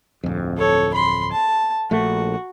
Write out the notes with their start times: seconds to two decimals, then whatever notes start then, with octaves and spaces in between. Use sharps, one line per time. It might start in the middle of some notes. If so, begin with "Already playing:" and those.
0.24 D1 F2
0.57 A4 C#5
0.93 B5 C6
1.32 A5
1.91 A#1 A3 F#4